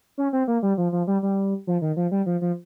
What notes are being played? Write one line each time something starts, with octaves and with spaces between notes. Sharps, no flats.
C#4
C4
A#3
G3
F3
F3
G3
G3
F3
D#3
F3
G3
F3
F3